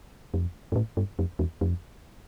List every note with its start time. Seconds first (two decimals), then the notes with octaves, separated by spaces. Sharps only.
0.34 F2
0.72 G2
0.76 A2
0.97 G2
1.19 F2
1.39 E2
1.61 F2